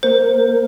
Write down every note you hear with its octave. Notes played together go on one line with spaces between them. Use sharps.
A#3 A#4 C5